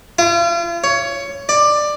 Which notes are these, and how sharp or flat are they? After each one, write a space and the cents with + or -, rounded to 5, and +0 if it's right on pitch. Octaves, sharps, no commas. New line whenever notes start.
F4 -40
C#5 +15
D5 +15